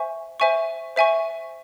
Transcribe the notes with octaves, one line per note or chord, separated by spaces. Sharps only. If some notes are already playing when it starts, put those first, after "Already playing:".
Already playing: C5 E5 G#5 C#6
C5 E5 G#5 C#6
C5 E5 G#5 C#6